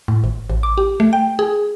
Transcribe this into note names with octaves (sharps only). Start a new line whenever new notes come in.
A2
G#1
A1
D6
G4
A3
G5
G#4